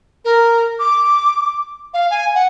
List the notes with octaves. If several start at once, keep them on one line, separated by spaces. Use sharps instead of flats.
A#4
D6
F5
G#5
F#5